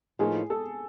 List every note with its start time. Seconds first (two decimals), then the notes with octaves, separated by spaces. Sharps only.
0.19 A2 F3 A#3 D#4 G#4
0.50 A4